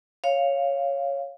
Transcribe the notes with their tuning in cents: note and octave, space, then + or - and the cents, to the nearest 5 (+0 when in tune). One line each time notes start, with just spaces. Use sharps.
C#5 +0 F5 -5